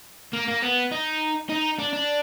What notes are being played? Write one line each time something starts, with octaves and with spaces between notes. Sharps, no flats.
A#3
A#3
B3
D#4
D#4
D4
D4